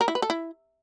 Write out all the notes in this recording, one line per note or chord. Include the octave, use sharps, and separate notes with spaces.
A#4
E4
B4
A4
E4